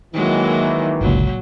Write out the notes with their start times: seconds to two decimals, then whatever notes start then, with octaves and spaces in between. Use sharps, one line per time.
0.14 D#3 E3 F#3 G#3 A#3
1.01 G1 C#2 A#2 F#3